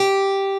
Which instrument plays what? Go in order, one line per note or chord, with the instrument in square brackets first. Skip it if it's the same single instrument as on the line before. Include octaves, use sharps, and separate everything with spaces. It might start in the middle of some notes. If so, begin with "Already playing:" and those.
Already playing: [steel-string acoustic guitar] G4